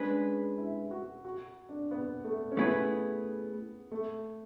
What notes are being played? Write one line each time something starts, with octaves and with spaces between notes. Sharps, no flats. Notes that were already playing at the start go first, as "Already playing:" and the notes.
Already playing: G#3 C#4 D4 G#4 B4
E4
F#4
F#4
D4
B3
A3
C#4
A3 B3 E4 G#4 B4
A3